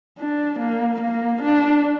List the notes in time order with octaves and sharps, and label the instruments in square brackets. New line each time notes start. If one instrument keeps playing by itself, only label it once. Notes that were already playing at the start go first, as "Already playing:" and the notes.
[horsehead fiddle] D4
A#3
A#3
D4